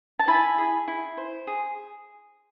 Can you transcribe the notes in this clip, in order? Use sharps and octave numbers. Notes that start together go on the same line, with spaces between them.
A5
E4 G#5 B5
G#4
E4
C5
G#4